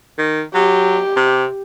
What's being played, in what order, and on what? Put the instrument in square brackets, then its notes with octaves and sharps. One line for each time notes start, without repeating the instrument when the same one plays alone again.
[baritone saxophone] D#3
[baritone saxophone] F#3 [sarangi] G4
[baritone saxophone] C3